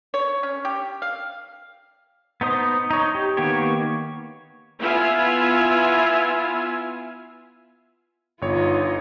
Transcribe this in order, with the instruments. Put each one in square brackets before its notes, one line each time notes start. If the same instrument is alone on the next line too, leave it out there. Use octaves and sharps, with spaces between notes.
[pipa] C#5
C#4
G4
F5
[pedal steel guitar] B3 D#4 C5 D#6
D#4 C#5
G4
D#3 A#3 B3 G4 C#5
[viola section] B3 E4 F4 E5 G#5
[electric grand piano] G1 C#5 [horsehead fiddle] D#4 F4